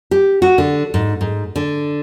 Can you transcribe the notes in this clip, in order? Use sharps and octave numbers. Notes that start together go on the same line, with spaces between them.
G4
F#4
D3
G#2
G#2
D3